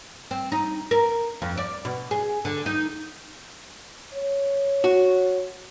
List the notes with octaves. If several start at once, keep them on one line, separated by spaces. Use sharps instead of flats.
C4
D#4
A#4
F2
D5
B2
G#4
D3
D#4
C#5
F#4